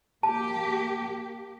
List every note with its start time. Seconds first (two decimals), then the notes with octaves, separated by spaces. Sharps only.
0.23 A#3 G4 A5